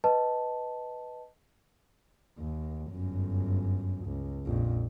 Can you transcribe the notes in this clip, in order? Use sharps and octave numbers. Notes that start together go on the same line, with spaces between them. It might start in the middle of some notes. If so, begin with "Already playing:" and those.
B4 D#5 A5
D#2
G1 F#2
C#2
A#1 F2